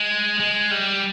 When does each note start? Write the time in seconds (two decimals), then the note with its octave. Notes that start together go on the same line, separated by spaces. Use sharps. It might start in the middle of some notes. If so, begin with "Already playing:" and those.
Already playing: G#3
0.40 G#3
0.71 G3